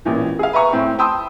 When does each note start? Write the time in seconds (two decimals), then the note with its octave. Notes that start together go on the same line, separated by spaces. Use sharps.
0.05 A1 A#2 E3
0.39 G#4 F5
0.53 B4 E5 G#5 A#5 C#6
0.73 A2 C4
0.99 G5 A5 B5 C6 D#6 E6